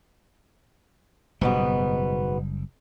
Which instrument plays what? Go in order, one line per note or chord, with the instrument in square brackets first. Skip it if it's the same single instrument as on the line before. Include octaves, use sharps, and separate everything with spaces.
[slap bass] F#1 G3 [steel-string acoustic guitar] G#2 B2 B3